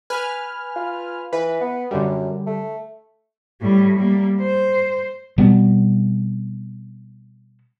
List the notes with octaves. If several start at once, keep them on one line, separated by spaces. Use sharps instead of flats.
B4 G#5 F6
F4
E3 B4
B3
F#2 D3 G3
A3
A2 G3
G3 A#3
C5
B2 G3 B3 C4